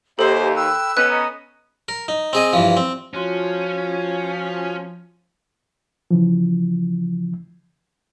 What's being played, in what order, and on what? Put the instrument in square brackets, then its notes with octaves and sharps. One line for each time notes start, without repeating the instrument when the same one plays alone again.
[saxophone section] D#2 [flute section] G4 D#5 E5 [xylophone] A4 [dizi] C5
[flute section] G5 B5 F#6 [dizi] E6
[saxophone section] B3 C#4 [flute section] D#5 [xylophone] F#6
[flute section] D#5 A#5 D#6
[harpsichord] A#4
D#4
C4 G#4 D#5
G2 E3 F3
C4
[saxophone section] F3 [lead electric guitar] C#4 [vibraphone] F4 F#4 C6
[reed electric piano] C#3 E3 F3